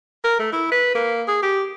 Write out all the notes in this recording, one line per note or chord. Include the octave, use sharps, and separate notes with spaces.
A#4
A3
E4
B4
A#3
G#4
G4